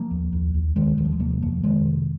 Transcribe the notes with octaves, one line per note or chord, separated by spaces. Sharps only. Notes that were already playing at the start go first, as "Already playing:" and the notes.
Already playing: F3 A#3
D#2
D#2
D#2
D#2 D#3 G#3
D#2 D#3
F3
G#3
C3 F3 A#3
F2 F3 A#3
F2 D#3 G#3
C3